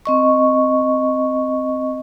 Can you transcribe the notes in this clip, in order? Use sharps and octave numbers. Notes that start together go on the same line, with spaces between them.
C4 D#5 C#6